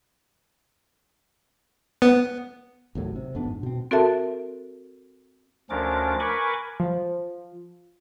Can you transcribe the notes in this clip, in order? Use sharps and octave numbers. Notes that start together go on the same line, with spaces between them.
B3
G#1 D#2 A2 F#3
C3
G#1 F2 B3 D4
G#2
B2 C4
C4 F#4 A4 A#4 E5 A5
D2 F3 C#4 D4 A#4 D6
A#4 B4 G#5 B5 C#6 D6
F3